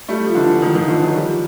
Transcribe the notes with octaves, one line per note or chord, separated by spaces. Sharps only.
G3 A3
F3
D3 E3
D#3 F3
D#3 F3
D3 E3
E3 F#3
F3 G3